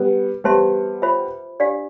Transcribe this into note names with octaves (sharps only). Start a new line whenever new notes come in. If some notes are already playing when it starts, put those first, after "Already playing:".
Already playing: G3 B3
G3 B3 G4 C5 E5 A5 C6
F4 C5 E5 B5
D4 G4 D5 F5